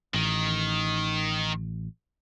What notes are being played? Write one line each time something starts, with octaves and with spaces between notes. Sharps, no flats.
A1 D#3